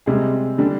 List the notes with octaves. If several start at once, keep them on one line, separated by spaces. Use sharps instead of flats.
C3 G3 G#3 G#4
D3 G3 D4